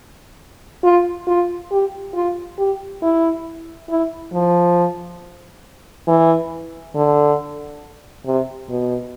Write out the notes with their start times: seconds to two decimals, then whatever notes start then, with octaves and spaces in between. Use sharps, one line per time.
0.84 F4
1.28 F4
1.72 G4
2.14 F4
2.58 G4
3.02 E4
3.90 E4
4.33 F3
6.08 E3
6.95 D3
8.26 C3
8.69 B2